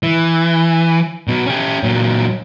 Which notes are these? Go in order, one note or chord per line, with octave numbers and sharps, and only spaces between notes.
E3
B2 F#3
C#4 G4
A#2 F#3